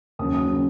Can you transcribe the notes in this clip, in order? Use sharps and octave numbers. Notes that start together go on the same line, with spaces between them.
D#2 C#3 F#3 D#6
D#6
C#3 F#3